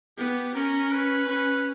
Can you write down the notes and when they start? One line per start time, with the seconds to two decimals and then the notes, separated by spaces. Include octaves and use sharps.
0.17 B3 G4
0.54 C#4 A#4
0.91 B4
1.27 C#4 B4